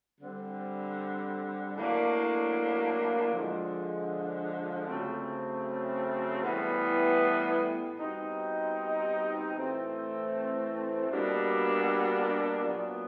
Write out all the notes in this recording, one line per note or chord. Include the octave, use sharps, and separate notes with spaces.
D3 G3 C4
A2 F#3 A#3 D4
D3 F3 G#3
C#3 F#3 A3 C4
A2 E3 G3 B3
B2 G3 C4 D#4
A2 E3 A3 C4
B2 G3 A#3 D4
A#2 F#3 B3